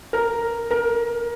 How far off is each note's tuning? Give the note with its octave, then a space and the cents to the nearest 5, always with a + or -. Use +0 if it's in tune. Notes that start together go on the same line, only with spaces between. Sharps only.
A#4 +0
A#4 +20